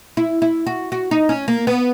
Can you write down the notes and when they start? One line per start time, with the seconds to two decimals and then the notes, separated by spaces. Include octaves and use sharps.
0.17 E4
0.42 E4
0.67 F#4
0.92 F#4
1.11 D#4
1.29 C#4
1.48 A#3
1.67 B3